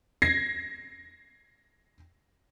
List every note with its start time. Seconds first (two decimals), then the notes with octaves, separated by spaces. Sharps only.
0.22 G#6 A#6 C7